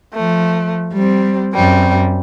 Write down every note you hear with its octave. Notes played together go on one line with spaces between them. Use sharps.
F3 A3
G3 C4
F#2 G3 C4